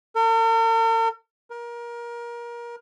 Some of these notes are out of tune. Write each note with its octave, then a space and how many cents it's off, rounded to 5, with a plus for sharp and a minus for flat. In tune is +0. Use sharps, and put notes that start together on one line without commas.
A#4 -45
A#4 +25